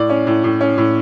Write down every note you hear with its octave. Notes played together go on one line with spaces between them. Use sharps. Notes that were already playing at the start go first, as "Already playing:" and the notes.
Already playing: A2 D5
C#4
A2
A2
C#4
A2